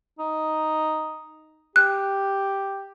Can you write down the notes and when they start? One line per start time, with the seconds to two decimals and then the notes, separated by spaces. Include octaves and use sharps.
0.19 D#4
1.76 G4 F#6